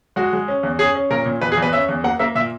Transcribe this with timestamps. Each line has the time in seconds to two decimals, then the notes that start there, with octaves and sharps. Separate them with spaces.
0.16 G#3 F#4
0.33 G#3
0.48 C#4
0.63 E2
0.79 C#4 G#4
0.95 C#4
1.10 A#2 A#4
1.25 A#2
1.41 E2 B4
1.52 G#4
1.57 E2
1.62 B4
1.73 C#4 E5
1.89 E2
2.04 A#3 F#5
2.19 A#3 E5
2.35 A#2 E5